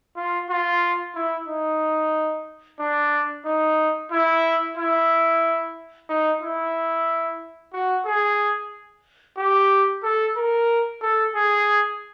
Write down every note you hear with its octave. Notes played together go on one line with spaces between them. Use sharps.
F4
F4
E4
D#4
D4
D#4
E4
E4
D#4
E4
F#4
G#4
G4
A4
A#4
A4
G#4